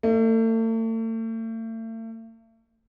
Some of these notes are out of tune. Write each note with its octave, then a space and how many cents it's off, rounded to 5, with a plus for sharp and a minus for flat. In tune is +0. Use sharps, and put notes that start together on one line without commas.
A3 +40 D#5 +0